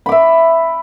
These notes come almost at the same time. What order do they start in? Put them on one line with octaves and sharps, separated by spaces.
B5 D6 E5